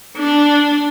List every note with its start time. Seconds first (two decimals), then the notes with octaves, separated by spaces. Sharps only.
0.17 D4